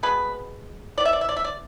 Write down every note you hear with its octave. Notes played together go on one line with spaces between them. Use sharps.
B2 G#3 B3 B4
E3 B3 D5
E5
D5
E5
D5
E5
D5